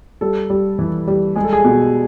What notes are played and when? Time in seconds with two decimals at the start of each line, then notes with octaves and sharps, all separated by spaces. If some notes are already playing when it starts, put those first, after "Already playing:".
0.21 G3 A4
0.50 G3
0.79 E3
1.07 G3
1.36 G#3 G#4
1.44 A4
1.53 G#4
1.64 B2